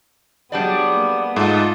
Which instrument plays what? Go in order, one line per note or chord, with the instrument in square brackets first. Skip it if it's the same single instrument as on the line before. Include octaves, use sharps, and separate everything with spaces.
[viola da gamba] F#3 G#4 [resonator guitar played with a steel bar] G3 D4 D5 [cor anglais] B3
[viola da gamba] A#3
[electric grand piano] G#2 [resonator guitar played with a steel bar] A3 [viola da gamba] F4 A4 D#5